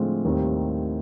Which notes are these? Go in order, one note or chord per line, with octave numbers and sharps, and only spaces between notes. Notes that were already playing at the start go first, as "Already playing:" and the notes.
Already playing: A2 D3 F3 G#3 C4 F4
D#2 D#3 G3 C4 D#4